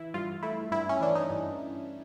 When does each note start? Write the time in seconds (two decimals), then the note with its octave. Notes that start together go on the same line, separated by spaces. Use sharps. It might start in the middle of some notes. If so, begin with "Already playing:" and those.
Already playing: E3 E4
0.14 G2 F4
0.43 A3 E4
0.71 G2 E4
0.89 C#4
1.01 E3 D4
1.15 D#4
1.30 G2